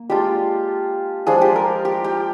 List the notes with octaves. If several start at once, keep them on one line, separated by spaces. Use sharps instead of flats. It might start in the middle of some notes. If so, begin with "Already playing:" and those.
Already playing: A#3
G#3 D4 F4 G4
F3 G#3 D4 F4 G#4
G4
A#4
G4
G4